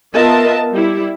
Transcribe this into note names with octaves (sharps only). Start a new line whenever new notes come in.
B3 F4 A#4 D#5 E5 A5
G3 E4